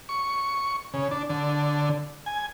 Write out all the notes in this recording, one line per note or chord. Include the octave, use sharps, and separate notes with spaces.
C#6
C#3
D4
D3
G#5